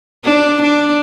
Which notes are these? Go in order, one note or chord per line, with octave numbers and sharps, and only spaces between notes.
D4
D4